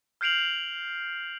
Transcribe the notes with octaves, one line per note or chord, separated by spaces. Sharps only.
F6 G6 C7 D7 F7 F#7